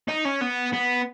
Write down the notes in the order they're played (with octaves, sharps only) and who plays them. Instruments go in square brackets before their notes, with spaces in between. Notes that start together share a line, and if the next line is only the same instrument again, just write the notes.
[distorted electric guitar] D#4
C#4
B3
B3